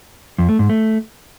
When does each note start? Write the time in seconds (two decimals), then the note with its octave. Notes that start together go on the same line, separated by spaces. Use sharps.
0.38 F2
0.49 A3
0.59 G#2
0.69 A3